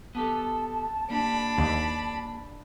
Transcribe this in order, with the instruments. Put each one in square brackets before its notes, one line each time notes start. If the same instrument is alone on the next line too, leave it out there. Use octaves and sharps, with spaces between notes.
[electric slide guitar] B3 G4 A4 [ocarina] A5
[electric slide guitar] A#3 G4 [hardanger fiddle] D4 B5
[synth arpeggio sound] D#2